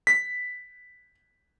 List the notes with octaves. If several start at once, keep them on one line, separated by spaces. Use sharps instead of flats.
B6